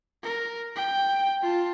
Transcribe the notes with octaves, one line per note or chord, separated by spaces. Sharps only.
A#4
G5
F4 A5